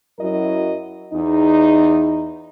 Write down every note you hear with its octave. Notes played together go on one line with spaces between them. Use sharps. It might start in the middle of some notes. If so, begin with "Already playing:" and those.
F#2 F#3 E4 A#4 D#5
E2 D#4